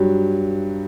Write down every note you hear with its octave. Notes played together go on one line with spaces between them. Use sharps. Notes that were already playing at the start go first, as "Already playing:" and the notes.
Already playing: G2 F#3